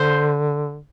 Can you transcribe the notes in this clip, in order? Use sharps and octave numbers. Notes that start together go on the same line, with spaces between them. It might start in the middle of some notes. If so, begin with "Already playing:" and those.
Already playing: D3 C5